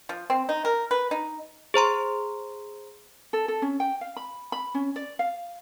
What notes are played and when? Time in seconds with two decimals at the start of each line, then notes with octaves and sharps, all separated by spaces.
0.09 F3
0.30 C4
0.49 D#4
0.65 A#4
0.91 B4
1.11 D#4
1.74 G#4 C5 A#5 C6
3.33 A4
3.48 A4
3.62 C#4
3.80 G5
4.01 F5
4.16 B5
4.52 B5
4.75 C#4
4.96 D5
5.19 F5